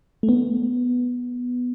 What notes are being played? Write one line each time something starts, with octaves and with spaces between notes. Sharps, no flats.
A3
B3